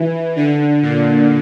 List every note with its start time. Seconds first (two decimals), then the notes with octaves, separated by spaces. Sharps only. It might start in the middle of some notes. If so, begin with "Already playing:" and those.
Already playing: E3
0.36 D3
0.82 A#2